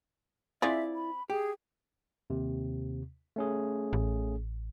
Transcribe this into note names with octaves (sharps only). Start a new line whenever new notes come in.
C4 E4 F4 G#4 D5 E5
B5
G4 G#4
D#2 C3
A3 C#4 G#4
A1